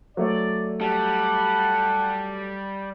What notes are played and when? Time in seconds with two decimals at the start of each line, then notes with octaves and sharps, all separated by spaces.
0.17 F#3 A3 C#5 D5
0.81 G3 A4 F#5